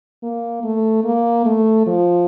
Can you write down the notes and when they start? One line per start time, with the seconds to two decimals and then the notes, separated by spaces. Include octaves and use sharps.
0.23 A#3
0.63 A3
1.04 A#3
1.45 A3
1.87 F3